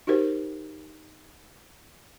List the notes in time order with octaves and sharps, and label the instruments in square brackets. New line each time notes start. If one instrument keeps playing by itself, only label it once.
[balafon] D#4 F#4 G4 A#4 C5